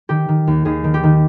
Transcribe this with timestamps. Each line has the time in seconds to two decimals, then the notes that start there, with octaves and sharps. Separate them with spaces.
0.09 D#3 G4
0.29 D#3
0.47 D#2
0.65 D#2 G#4
0.84 D#3
0.94 G4
1.04 D#3